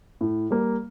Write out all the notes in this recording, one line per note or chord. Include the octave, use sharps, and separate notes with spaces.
A2
G3 A#3